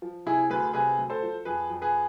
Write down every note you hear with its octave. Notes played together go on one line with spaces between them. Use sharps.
F3
C3 E4 G#4
D2 G#4 B4
C3 G#4 B4
D2
A4 C5
F3
F2 G#4 B4
F2
G#4 B4